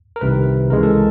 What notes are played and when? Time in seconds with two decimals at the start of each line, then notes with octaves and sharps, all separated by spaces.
0.16 A#4
0.21 C2 C3 D#3 B4
0.70 C#2 C#3 E3 G#3 A#4
0.83 A4